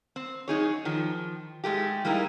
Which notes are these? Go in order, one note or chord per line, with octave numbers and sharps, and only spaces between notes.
C4
F#2 D#4 G#4 C#5
D#3 F3
G#2 G#3 A3 G4
G3 G#3 A#3 D#4 E4